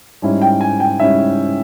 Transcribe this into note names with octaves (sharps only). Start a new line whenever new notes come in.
G#2 G3 C#4 E4
G5
G#5
G5
G#2 G3 C#4 E4 E5